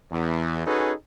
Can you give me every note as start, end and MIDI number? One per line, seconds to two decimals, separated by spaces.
0.12 0.63 40
0.67 0.93 61
0.67 0.93 63
0.67 0.93 66
0.67 0.93 68
0.67 0.93 69
0.67 0.93 71